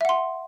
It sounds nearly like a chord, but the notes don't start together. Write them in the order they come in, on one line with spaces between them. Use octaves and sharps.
E5 F#5 C6